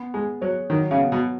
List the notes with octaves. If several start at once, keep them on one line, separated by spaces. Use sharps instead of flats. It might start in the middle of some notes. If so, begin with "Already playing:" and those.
Already playing: B3
G#3 G#4
F#3 C#5
D#3 F#3
C#3
B3
B2